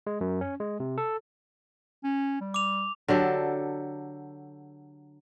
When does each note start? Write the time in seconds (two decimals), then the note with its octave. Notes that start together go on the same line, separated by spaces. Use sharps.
0.07 G#3
0.21 F#2
0.41 C#4
0.60 G#3
0.80 C3
0.98 A4
2.04 C#4
2.41 G3
2.54 D6 F7
3.08 D3 F#3 G4 A4